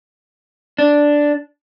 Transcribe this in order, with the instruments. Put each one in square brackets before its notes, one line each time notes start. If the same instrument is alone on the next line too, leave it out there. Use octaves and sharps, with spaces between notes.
[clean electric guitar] D4